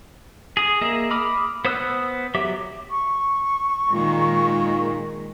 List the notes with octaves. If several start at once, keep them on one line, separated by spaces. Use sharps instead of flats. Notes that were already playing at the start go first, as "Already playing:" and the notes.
G#4 D#6
A#3 G#4 D#5 E5
B5 D6 D#6 F6
B3 C5 D#6 E6 F#6
F#3 G4 E5 D6
C#6
A#2 D#3 G#3